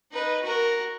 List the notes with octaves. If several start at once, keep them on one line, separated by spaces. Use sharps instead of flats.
D#4 B4
F#4 A#4